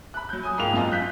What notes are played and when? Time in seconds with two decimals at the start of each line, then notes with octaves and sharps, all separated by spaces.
0.14 B5 F#6
0.29 F#3 G6
0.43 G#5 D#6
0.58 G#2 G#3 A#3 F4 G5 F7
0.73 F#2 F4 D#5
0.92 F#6 G6 B6